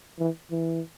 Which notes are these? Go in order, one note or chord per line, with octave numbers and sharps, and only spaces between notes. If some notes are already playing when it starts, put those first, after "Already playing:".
E3
E3